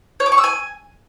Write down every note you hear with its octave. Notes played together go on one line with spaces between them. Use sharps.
C#5
D6
C#6
E6
G#5